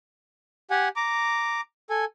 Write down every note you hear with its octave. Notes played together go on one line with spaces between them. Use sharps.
G4 F#5 G#5
A#5 D6
A4 G#5